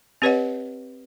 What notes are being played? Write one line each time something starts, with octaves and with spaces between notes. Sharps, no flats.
C4 G4 B4 C#5 D#5 F#5